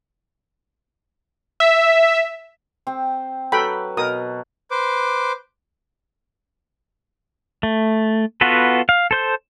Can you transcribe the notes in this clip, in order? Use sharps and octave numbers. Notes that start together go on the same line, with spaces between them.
E5
C4 G5
F#3 A4 B4 G5 B5
B2 A#4 D#6
B4 C5 D6
A3
B3 F4 F#4 A4 B4
F5
A4 C5 G6